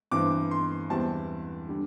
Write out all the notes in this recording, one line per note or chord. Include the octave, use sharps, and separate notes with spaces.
G2 E3 C4 D6
C6
E2 E3 G3 C4 A5
D3 G3